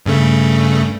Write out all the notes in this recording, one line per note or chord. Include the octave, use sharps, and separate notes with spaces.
G2 C#3 A3